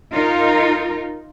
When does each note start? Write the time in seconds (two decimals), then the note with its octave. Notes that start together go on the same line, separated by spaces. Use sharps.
0.12 D#4 F4 A#4